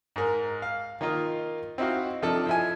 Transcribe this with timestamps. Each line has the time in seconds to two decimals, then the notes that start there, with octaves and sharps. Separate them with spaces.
0.16 G#2 A#4
0.62 F5
1.01 D#3 A#3 D#4 F4
1.78 C4 D#4 E4 F#4 F5
2.22 C3 F3 D4 D#4 A4
2.46 F3 E4 G#5